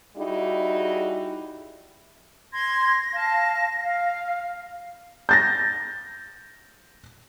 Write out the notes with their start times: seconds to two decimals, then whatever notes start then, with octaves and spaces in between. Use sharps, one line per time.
0.17 G3 D#4 E4 F#4 G#4
2.52 C6 G#6 A#6
3.13 F5 A5
3.84 F5
5.29 G6 A6 A#6